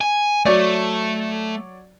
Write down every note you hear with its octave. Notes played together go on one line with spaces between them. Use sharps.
G#5
F#3 A3 C#5 D5